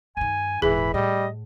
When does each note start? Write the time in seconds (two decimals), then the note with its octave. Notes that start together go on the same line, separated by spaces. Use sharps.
0.17 G2 D#3 G#5
0.62 D#1 G#2 E3 G#4 B5
0.94 A2 G3 D#5